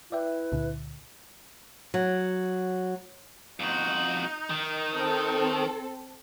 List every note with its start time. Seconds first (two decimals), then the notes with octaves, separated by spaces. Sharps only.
0.12 E4 B4 D5 E5 G5
0.52 C#2 A#2 D3
1.94 F#3
3.60 F2 D#4 F#4
4.50 D#3
4.96 C4 A4